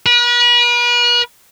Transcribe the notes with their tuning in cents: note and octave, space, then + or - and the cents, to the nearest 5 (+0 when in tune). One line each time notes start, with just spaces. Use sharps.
B4 -40